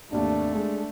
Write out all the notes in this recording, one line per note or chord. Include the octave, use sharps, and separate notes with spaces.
G#1 D#2 A3 D4
G#3 D4